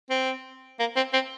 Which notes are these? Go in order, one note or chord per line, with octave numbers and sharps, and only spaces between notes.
C4
A#3
C4
C4